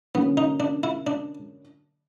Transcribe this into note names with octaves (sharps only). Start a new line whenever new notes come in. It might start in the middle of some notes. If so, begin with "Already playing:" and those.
D3 F#3 A#3 B3 C#4
D#4
D4
E4
D4